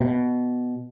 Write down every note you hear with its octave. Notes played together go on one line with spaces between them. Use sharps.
B2